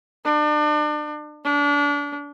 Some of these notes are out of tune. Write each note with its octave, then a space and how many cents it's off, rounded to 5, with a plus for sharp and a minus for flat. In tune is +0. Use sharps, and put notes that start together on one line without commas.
D4 +35
D4 -30